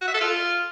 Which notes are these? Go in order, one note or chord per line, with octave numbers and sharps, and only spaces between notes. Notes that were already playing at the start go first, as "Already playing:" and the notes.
F#4
E5
A4
F4